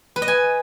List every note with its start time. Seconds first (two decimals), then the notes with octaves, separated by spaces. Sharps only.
0.16 B4
0.22 D#5
0.28 G#5